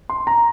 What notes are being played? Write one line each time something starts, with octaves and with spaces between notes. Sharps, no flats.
C6
A#5